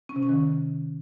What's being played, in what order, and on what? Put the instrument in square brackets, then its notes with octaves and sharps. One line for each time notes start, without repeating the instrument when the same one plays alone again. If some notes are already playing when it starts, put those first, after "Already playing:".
[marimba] C#4
C3
C#4
D#3